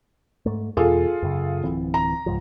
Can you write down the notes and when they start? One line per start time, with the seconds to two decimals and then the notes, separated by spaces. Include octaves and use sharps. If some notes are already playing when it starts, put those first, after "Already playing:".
0.46 G#2 A3
0.77 E2 B2 F4 G#4 A4
1.23 F#2 C#3
1.64 D1 E3 C4
1.94 A#5
2.26 C#2 G#2 F3